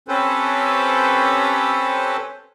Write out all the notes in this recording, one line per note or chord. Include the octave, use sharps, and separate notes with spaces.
C4 C#4 G4 A4 B4 C5